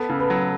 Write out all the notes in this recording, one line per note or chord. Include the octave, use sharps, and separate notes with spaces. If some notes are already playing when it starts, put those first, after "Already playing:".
Already playing: B3 A4
C#3
B4
F#3